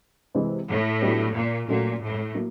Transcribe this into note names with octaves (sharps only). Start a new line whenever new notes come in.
C3 E3 G#3
A2
F#3 B3 D4 G4
A#2
A#2 F#3 A3 C#4 F#4 A4
A2
F#3 A#3